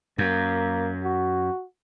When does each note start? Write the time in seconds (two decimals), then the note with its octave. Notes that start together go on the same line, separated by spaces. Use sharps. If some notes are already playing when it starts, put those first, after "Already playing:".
0.18 F#2 A#3
1.03 F#4